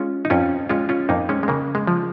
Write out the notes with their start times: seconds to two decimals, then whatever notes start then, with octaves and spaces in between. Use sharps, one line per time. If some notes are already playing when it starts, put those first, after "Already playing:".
Already playing: G#3 C#4 F4
0.25 D#4
0.30 F2 C#4 F4
0.69 G#3 C#4 F4
0.89 C#4 F4
1.09 F2 A#3 D#4
1.29 G#3 C#4
1.43 G#3
1.48 C#3 A#3
1.75 G#3
1.87 F3